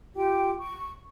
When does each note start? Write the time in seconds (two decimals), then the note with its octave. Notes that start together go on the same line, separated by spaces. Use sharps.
0.16 F4 G4 G5 D6
0.58 C#6